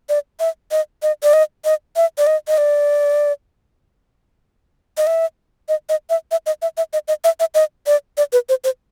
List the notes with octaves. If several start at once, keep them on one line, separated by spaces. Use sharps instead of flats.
D5
E5
D#5
D#5
D5
D#5
D#5
E5
D5
D#5
D#5
D5
D#5
E5
D#5
D#5
E5
E5
D#5
E5
E5
D#5
D#5
E5
E5
D#5
D5
D5
B4
C5
C5